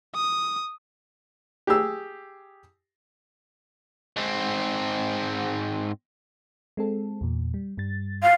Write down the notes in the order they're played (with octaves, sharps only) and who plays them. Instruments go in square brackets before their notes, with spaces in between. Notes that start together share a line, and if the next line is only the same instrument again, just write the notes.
[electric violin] D#6
[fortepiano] G4 G#4 E6
[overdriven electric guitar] G#2 C4
[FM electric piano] G#3 C4 A4
E2 A#2
G3
G2 G3 A6
[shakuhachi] F5